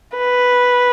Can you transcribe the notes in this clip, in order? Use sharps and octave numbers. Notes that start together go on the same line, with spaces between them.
B4